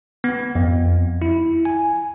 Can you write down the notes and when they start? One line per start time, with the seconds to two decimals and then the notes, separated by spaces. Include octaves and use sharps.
0.24 B3
0.55 F2
1.22 E4
1.65 G#5